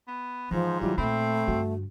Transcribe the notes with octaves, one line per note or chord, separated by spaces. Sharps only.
B3
G#2 E3 F3
D#3 F#3 G3 E4 F4
A#2 A3 C4 D#4 F4 B5
G2 D3 F#4